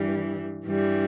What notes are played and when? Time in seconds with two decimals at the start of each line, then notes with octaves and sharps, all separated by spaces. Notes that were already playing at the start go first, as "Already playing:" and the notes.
Already playing: G2 E3 G3
0.64 G2 E3 G3